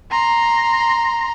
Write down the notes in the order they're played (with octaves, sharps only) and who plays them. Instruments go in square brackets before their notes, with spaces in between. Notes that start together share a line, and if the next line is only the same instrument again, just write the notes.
[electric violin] A#5 C6